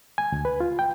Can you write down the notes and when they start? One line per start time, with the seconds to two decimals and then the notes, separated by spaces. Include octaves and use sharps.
0.18 G#5
0.32 D2
0.45 B4
0.60 F4
0.79 G5